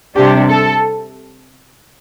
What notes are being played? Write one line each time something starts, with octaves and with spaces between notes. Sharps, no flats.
C3 G3 D4 G4
A4